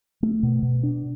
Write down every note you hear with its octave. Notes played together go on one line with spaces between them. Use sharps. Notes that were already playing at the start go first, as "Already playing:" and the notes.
A3
B2
B2
D4